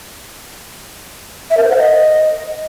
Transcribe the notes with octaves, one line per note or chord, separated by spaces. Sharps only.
E5
A#4
C5
F#5
D#5